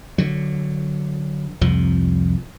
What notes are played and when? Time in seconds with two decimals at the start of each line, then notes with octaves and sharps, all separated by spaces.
0.18 D3 F#3
1.61 C2 F2 F3